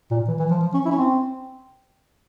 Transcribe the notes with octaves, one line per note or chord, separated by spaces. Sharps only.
A#2
E3
E3
F3
F3
C#4
E4
C#4
C4